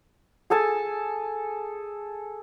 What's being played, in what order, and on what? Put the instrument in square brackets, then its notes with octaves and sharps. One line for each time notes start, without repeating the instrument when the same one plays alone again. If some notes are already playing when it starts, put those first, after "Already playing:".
[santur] G#4 A4 G#5 A5